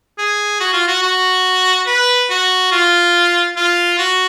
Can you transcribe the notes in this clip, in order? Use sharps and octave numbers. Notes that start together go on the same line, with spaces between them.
G#4
F#4
F4
F#4
F#4
B4
F#4
F4
F4
F#4